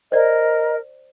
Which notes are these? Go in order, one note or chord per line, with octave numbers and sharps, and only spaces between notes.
A#4 C5 D5 D#5